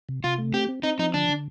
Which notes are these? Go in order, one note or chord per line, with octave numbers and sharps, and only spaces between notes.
C3
C3 F4
A3
C4 G4
C4
C4 D#4
F3 D#4
D3 D4
D3